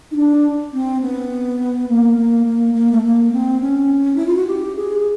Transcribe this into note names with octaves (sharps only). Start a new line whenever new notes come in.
D#4
D4
C4
B3
A#3
A#3
A#3
A#3
A3
A#3
C4
C#4
E4
F4
F#4
G4
G#4